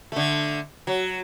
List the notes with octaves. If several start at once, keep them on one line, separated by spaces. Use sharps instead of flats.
D3 A3
F#3